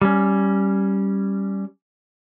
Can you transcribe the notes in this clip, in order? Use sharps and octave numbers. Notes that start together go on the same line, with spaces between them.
G3 C#4